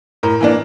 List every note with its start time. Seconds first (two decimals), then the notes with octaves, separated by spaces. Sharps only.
0.23 A2 A#4
0.41 E3 A#3 D4